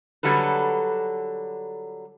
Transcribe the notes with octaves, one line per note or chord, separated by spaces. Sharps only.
D3 F#3 G3 F#4 A4 B4